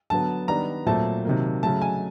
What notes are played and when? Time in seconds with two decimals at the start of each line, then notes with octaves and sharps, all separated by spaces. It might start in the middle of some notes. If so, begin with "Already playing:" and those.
0.10 D3 F#3 B3 A5
0.48 D#3 G3 B3 D4 A#5
0.86 A#2 F#3 A3 C4 A5
1.25 C3 D#3 F#3 A#3
1.63 C#3 F#3 A3 A5
1.82 G#5